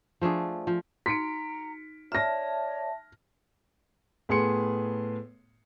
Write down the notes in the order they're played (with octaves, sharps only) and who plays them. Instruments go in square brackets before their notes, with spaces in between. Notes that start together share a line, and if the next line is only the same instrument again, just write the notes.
[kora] F3 A3 D4 G#4
F3
[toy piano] D#4 F#4 [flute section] A#5 [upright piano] B6 C#7 D7
[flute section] C#5 D5 [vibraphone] E5 A5 [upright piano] F6 A#6
[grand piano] A2 B3 G#4 C6 C#7